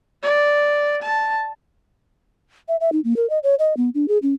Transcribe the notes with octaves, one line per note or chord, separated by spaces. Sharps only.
D5
A5
E5
E5
D#4
A#3
A#4
D#5
C#5
D#5
B3
D4
G#4
C#4